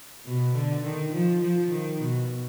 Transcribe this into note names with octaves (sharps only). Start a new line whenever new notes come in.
B2
D3
D#3
F3
F3
D#3
B2